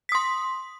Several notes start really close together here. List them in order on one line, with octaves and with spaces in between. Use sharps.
B6 D#6 C6